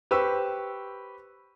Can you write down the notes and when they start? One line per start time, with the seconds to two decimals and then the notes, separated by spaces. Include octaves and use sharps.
0.11 G4 B4 C5 C#6 E6